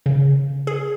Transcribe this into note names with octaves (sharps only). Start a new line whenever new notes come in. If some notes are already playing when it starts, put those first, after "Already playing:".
C#3
G#4